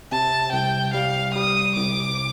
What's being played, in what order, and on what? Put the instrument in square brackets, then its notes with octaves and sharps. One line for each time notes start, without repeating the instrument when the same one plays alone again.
[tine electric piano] C3 [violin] A5
[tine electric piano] C2 [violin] G5
[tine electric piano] G3 [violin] F5
[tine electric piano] G3 [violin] D#6
[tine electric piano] C2 [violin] D6